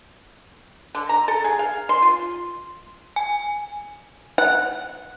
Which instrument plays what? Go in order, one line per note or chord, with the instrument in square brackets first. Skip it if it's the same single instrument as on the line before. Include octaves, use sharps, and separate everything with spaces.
[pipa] D3
A#5
A4
G#4
F5
C6
F4
[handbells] G#5
[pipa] F#5